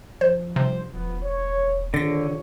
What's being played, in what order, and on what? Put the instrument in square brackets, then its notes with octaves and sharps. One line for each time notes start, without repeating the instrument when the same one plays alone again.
[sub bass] F3 [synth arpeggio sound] C5
[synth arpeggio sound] C3 [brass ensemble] G3 D4 C5
[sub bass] E1 [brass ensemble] F3 B3
[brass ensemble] C#5
[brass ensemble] A#1 C#5 [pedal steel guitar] D3 [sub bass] D#3 [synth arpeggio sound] A6 A#6